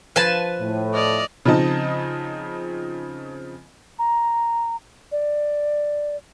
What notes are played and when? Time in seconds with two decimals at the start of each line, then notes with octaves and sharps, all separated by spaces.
0.16 F3 B4 G#5 A5
0.61 A2
0.94 D5 D#5 F6
1.45 C#3 F3 C4 D#4 D#5 A5
3.99 A#5
5.12 D5